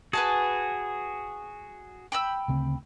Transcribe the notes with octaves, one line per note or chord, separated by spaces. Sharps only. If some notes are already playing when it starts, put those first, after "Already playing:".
F#4 G#4 B4 G#5 A5
G5 B5 E6
D2 C#3 C4